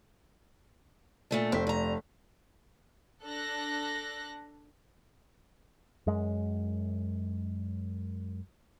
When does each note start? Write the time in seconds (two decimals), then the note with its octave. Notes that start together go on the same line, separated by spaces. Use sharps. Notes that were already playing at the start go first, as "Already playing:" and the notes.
1.31 A#2 A3 D4
1.52 F1 C4 B6
1.67 G2 A#5
3.23 D4 A4 F#6 A#6
6.07 F#2 G#3